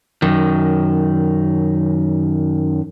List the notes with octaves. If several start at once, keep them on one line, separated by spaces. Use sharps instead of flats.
F#2 D#3